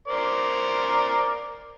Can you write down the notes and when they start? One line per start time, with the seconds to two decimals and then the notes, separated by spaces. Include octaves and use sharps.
0.08 A#4 C5 D5